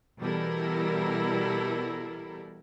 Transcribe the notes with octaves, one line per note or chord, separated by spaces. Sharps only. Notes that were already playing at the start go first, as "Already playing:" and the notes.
B2 E3 G3 E4 A4 A#4